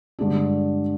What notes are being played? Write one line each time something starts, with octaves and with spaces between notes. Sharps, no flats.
G2 D3 G#3 D4